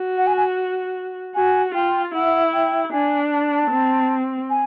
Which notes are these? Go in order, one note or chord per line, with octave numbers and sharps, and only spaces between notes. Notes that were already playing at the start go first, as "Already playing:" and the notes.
Already playing: F#4
F#5
G#5
G#5
F#4 G#5
F4 G5
E4 F#5
G5
D4 G#5
A5
C4
G#5